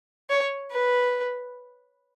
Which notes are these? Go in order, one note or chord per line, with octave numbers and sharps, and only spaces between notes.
C#5
B4